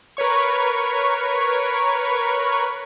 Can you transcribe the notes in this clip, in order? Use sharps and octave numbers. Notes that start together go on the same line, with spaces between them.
A#4 B4 C#5 C#6